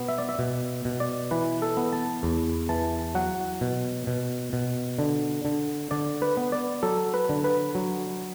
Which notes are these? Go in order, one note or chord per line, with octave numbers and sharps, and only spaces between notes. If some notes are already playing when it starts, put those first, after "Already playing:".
Already playing: B2 B3
E5
D5
E5
B2
B2
D5
E3 B4
A4
B3
A5
E2
E3 A5
F#3 F#5
B2
B2
B2
D3
D3
D3 D5
B4
B3
D5
F#3 A4
B4
D3
B4
F#3